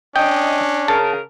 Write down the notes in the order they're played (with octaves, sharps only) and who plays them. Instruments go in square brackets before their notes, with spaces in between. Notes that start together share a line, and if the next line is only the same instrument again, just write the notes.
[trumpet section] C#4 D4 [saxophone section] D#5 [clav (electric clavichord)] G5
[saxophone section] C#3 A#4 [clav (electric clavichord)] A5